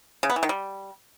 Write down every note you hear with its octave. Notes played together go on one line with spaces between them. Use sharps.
C#3
B3
E3
D#3
G3